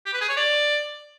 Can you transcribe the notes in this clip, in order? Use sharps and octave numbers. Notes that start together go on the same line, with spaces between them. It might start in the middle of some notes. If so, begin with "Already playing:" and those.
G4
B4
G#4
C#5
D5